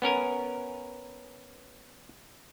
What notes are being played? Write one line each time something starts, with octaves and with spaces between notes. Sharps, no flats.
B3 C#4 A#4 G#5